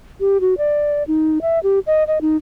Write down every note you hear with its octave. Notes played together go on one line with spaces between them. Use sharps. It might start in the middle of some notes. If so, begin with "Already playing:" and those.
G4
F#4
D5
D#4
E5
G4
D#5
D#5
D#4